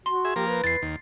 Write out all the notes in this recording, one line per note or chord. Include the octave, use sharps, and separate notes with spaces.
F#4 C6
G#4 E5
F3 A#3 G4 A#4
B4
E2 A6 C7
D#2